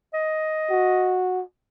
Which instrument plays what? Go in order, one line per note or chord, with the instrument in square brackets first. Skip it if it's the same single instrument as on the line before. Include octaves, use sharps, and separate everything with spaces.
[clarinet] D#5
[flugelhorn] F#4